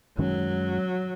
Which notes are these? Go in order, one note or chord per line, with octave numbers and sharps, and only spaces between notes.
F#2 D#3 F#3 G#3 C#4